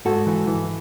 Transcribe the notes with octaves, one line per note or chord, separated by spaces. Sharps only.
G#2 F#4 A4
E3
E3